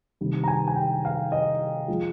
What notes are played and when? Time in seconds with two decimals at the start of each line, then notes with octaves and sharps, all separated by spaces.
0.21 C3 D#3 G3
0.44 A#5
0.48 G#5
0.68 G#5
0.76 G5
1.05 F5
1.32 D#5
1.88 F3 G#3